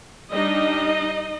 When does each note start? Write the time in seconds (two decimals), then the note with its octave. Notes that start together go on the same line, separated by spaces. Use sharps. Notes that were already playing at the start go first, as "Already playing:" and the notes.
0.33 G3 D4 D#4 D#5